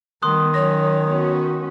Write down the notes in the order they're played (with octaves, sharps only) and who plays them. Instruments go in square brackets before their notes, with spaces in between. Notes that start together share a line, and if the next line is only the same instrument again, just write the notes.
[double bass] D#3 [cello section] G3 B3 [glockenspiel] C6 D#6 F#6
[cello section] F#3 C#4 [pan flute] C#5 [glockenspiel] A#6
[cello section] B3 C#4 F#4